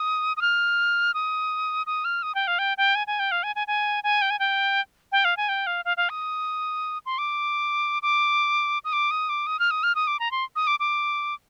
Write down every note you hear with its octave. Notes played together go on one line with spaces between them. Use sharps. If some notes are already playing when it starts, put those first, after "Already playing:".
Already playing: D#6
D#6
F6
D#6
D#6
F6
D#6
G5
F5
G5
G5
G#5
G#5
G5
F5
G#5
G#5
G#5
G#5
G5
G#5
G5
G5
F5
G#5
G5
F5
F5
F5
D#6
C6
D6
D6
D#6
D6
D#6
D6
D#6
F6
D#6
F6
D#6
D6
A#5
C6
D#6
D6
D6